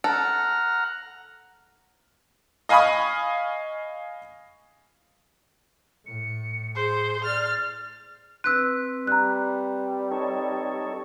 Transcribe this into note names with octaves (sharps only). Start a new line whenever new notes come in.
A4 F#5 A#5 F6
D#5 F5 G#5 B5 C#6 D#6
A2 C#7
G#4 C5 C7
D5 F6 A6
C4 B4 E6 F#6
G3 A#5 F#6
D#4 A4 C#5